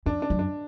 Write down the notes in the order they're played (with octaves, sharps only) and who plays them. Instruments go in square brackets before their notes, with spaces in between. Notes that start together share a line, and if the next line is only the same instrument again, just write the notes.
[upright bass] F2 [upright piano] D4
[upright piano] D4
[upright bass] F#2
[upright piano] D4